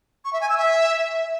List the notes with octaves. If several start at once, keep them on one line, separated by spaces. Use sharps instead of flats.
C#6
E5
G#5
E6
E5